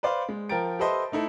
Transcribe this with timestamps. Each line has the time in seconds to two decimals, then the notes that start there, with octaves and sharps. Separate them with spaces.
0.03 B4 C5 D5 F5
0.29 G#3
0.49 F3 A#4 G5 A#5 A6 D7
0.79 G4 A4 B4 C5 D#5 E5
1.12 A3 D#4 E4 A4